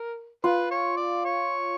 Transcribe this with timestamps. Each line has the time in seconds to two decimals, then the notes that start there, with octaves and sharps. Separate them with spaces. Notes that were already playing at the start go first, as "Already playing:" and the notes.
Already playing: A#4
0.44 F4 B4
0.71 C#5
0.97 D5
1.25 C#5